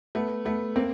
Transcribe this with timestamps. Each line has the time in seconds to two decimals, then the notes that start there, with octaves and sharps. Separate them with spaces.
0.15 A3 B3
0.45 A3 B3
0.76 A#3 C4